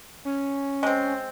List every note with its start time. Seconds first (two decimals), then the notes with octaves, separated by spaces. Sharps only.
0.25 C#4
0.83 G#3 C4